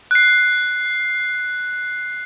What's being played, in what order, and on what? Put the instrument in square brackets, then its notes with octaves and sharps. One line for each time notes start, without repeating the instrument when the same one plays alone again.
[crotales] F#6 C7